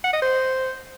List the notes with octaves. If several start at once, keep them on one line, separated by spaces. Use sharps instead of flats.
F#5
D#5
C5